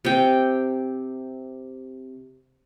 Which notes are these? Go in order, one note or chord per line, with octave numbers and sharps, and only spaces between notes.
C3 G5